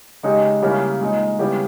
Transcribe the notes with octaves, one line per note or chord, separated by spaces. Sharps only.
C#3 G#3 D#4 G4
C#3 G3 A#3 C#4 E4
A#2 G#3 D#4
C#3 G3 B3 E4 G4